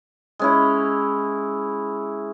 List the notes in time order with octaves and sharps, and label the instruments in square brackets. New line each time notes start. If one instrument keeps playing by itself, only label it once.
[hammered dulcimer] G#3 C#4 E4